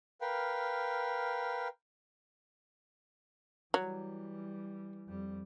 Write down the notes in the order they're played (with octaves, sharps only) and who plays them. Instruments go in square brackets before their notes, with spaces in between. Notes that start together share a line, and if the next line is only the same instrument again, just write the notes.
[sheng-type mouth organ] A#4 B4 F5 G5
[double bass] E3 G3 [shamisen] F#3
[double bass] F2 G3